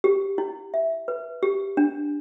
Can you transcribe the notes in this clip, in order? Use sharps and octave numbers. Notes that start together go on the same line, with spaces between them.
G4
E4
E5
B4
G4
D4